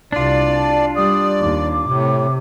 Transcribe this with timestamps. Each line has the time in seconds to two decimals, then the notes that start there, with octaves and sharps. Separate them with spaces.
0.12 C2 C3 D4 F4 D5
0.56 A5
0.96 G3 D5 D#6
1.40 D#2 D6
1.88 A2 C3